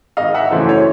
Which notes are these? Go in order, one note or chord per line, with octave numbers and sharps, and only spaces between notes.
G#1 D#5 F5
E5 F#5
F#2 C#3 E3 A3 C5
C#5